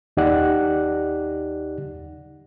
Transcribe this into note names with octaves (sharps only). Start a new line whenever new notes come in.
D#2 D#4 G4 D5 F#5 F#6